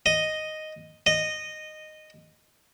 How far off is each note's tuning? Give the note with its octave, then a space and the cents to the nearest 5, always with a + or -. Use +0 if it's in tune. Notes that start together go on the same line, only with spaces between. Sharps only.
D#5 +0
D#5 -10